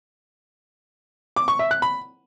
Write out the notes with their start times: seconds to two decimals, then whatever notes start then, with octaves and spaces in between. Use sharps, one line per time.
1.36 D6
1.48 C#6
1.59 E5
1.71 F#6
1.82 B5